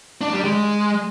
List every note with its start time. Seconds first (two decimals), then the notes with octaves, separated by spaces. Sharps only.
0.21 D4
0.33 G3
0.45 G#3